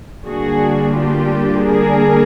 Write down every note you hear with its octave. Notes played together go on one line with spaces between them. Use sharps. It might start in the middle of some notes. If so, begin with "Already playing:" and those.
D3 G3 A#3 D4 F#4 G#4
F4 G4
G#4 A#4